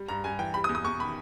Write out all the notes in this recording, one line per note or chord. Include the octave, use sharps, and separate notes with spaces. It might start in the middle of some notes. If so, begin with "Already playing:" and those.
Already playing: G3
G2 A#5
G2 G#5
E3 G5
G3 B5
D#6
E2
D#6
E2 C#6
D#3 B5